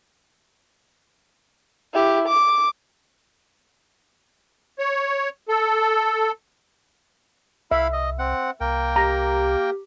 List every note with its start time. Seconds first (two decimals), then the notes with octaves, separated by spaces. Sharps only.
1.94 E4 G4
2.28 D6
4.79 C#5
5.49 A4
7.71 C2 E4 E5 F5 B5
7.93 D#5
8.19 C4 F#5
8.61 C2 A#3 A#4 G5
8.96 G4 A#5